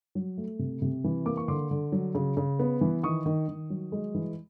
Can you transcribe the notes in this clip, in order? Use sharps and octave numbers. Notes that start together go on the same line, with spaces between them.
F#3
A3
C3
C3
E3
A#3 D6
C#6
D3 C6 D6
D3
F#3
C#3
C#3
B3
E3
D#3 C#6 D#6
D#3
D#3
F#3
G#3
E3